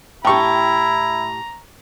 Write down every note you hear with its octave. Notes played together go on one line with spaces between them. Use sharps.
A2 E4 G4 G5 A#5 C#6